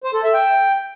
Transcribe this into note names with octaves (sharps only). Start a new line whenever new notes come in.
C5
A4
E5
G5